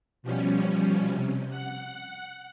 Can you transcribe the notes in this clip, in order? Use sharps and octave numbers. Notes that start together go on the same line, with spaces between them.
B2 F3 G3 C#4
C3
F#5